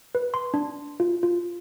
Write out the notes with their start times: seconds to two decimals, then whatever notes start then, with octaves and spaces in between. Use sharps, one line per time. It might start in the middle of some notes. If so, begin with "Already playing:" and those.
0.15 B4
0.34 C6
0.54 D4
1.00 F4
1.23 F4